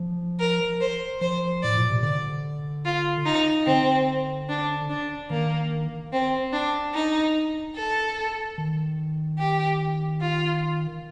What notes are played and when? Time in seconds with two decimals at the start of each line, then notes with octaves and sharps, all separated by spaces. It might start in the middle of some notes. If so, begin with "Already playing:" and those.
Already playing: F3
0.39 A#4
0.81 C5
1.21 F3 C5
1.63 A2 D5
1.77 A#2
1.90 C3
2.03 D3 D5
2.85 F4
3.25 D#4
3.66 D3 C4
4.49 D4
4.89 D4
5.30 D#3 A#3
6.13 C4
6.53 D4
6.94 D#4
7.76 A4
8.58 D#3
9.39 G4
10.21 F4